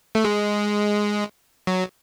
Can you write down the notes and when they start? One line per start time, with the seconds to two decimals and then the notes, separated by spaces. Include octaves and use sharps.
0.15 A3
0.25 G#3
1.67 F#3